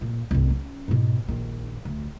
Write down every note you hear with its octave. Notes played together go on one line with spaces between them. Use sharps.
A#2
C2 G2
C#4
G#2 B2
A#1 D#3
D2